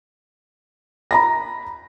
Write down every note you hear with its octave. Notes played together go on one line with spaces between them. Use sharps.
A#5 B5 A#6